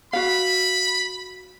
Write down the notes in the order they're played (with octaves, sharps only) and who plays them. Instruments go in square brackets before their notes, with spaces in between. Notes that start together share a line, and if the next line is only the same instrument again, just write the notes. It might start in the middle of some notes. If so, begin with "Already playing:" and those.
[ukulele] F#4 F5 [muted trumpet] B5